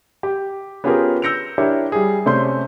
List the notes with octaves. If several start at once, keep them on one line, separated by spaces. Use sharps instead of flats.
G4
B3 C#4 F4 G4 G#4 A#4
E6 G6 A#6 C#7 D7 F7
D4 E4 G4 A#4 C#5
G3 G#4
C3 A3 C#4 D5 C6 G6